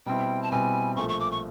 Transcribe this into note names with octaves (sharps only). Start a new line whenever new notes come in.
B2 G3 C4 E4 G5
A5
B2 G3 C4 E4 G#5
A#1 A#2 F3 A3 C#6
C#6
D6
C#6